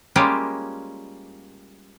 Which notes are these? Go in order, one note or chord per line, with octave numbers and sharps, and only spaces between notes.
G3 G#3 A#3 C#4 F4 G4